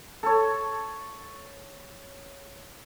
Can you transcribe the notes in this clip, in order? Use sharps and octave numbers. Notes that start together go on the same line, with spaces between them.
A4 C#5